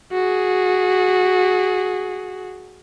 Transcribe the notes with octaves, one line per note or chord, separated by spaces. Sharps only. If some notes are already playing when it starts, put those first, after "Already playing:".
F#4 G#4